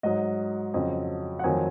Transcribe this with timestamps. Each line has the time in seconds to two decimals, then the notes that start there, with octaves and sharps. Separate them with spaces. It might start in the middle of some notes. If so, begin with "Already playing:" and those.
0.03 G#2 F#3 D#5
0.74 F2 C#3 F#3 D#5
1.39 F#5
1.44 F2 D#3 F#3 G#5